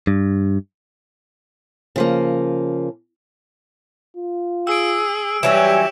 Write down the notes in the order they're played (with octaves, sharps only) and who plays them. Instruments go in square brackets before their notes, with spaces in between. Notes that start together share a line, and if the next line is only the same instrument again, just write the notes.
[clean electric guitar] G2
[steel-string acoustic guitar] C#3 F3 A#3
[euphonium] F4
[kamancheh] G#4 [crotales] E6 D7
[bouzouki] E3 F#3 C#4 [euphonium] G3 [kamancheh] G4 C#5 [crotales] E7